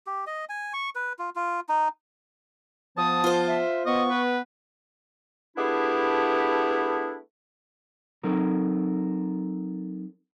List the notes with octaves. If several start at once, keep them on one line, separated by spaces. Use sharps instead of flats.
G4
D#5
G#5
C#6
B4
F4
F4
D#4
F3 B3 A5 D#6
F4 C5
E5
B3 D#5 C#6
B4
A3 B3 D4 E4 G4 G#4
F#3 C4 D#4 A4 A#4